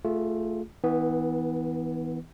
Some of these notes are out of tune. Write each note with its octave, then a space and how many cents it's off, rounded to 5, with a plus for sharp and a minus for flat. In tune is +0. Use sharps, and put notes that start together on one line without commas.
A3 +0 F4 +0 G#4 +20
E3 -35 B3 +0